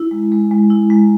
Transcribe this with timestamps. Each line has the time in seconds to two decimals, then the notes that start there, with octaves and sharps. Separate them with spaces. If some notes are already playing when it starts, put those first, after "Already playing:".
Already playing: E4
0.11 G#3
0.32 G#3
0.51 G#3
0.70 E4
0.90 G#3